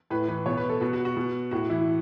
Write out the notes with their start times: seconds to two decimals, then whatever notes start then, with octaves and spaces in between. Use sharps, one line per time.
0.10 A2 B4
0.28 E3 B4
0.46 B2 C#5
0.57 B4
0.69 A4
0.81 B2 F#4
0.93 F#4
1.05 F#4
1.16 B2
1.51 A2 F#4
1.69 E3 E4